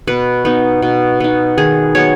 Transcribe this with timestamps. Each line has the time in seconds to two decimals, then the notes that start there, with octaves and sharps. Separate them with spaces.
0.07 B2 B4
0.45 B3 D#4
0.82 B2
1.20 B3 D#4
1.58 D#3 G#4
1.95 F#3 B3 C#5